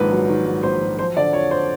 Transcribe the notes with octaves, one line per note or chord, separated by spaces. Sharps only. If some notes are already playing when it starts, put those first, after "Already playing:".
Already playing: A#1 G#2 D#3 B4
F#3
D#3
G#2
A#1 C5
F#3
F3 C5
D3 D5
F2 C#5
C5